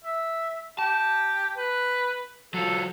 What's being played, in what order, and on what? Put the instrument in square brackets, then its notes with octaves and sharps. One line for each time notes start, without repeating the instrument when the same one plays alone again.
[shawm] E5
[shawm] G4 [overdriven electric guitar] A5
[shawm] B4
[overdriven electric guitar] F#3 F4 [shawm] A4